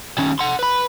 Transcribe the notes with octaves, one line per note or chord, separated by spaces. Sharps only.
D#3 C#4
F#5 C6
B4 B5